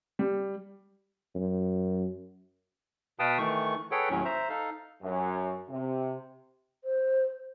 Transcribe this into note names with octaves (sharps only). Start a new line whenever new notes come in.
G3
F#2
B2 B4 F5 G5 A5 D#6
D#3 E3 A3 C#6
G#4 A4 B4 C#5 F#5 G5
D#2 A2 F#3 C#4
C5 E5 A#5
D#4 A4 F5
F#2
C3
C5